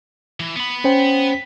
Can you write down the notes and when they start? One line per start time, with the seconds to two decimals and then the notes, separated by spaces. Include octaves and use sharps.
0.40 E3
0.56 B3 B5
0.84 C#4 C5 G5